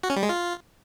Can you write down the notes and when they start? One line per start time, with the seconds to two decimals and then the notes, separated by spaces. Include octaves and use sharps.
0.03 F#4
0.10 C#4
0.16 G3
0.23 G#3
0.29 F4